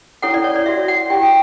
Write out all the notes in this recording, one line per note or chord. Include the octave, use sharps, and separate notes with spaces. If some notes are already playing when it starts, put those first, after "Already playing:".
C#4 E4 A4 C#5 F#5
D5
C#5
D5
F#4 C#5 E5
F#5
E4 G4 C#5 G5
G5